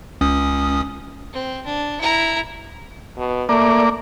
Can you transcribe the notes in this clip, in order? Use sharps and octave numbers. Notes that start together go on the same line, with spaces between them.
C#2 C#4 D#6
C4
D4
E4 A#5
B2
A3 A#3 D5